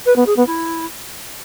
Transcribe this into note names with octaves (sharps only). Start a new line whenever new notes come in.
B4
B3
G#4
B3
E4